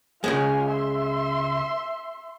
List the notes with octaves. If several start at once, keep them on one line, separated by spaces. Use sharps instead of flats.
C#2 C#3 G#3 F4 G#5
E5 C6